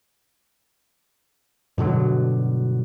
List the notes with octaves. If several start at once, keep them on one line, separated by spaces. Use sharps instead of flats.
G2 B2 D3 F#3